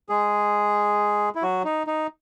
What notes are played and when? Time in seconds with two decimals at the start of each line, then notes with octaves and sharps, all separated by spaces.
0.09 G#3 G#4
1.35 E4
1.42 F#3 F#4
1.65 D#4
1.87 D#4